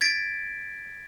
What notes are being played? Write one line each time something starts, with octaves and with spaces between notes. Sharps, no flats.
G#6 A6 B6 D7